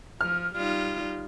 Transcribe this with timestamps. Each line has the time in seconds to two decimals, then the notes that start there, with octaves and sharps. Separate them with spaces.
0.21 F3 F6
0.56 G3 D#4 F4